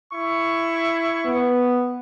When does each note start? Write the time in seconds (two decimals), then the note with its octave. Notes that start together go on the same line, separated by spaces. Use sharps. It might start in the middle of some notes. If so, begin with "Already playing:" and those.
0.13 E4 C#6
1.26 B3